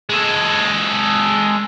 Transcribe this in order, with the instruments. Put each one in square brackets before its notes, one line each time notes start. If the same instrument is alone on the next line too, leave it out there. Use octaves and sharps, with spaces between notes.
[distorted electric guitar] G#3 A4